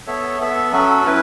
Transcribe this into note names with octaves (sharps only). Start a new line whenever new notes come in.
B3 A4 C#5 E5
B3 A4 E5
F#3 C#4 F#4 A4
C#4 E4 B4